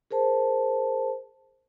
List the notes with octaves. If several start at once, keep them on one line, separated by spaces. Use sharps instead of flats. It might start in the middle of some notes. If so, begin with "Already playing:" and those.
G#4 A#4 C5 A5